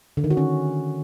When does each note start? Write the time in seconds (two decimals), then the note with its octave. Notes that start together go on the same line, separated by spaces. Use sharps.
0.17 D3
0.24 D#3
0.30 F#4
0.37 C#4